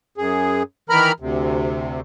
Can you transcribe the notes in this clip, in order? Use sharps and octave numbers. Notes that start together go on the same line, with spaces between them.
F#2 G#4
D#3 E3 A#4 A#5 B5 F6
D2 C3